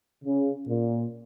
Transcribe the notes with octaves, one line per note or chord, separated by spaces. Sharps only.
C#3
A#2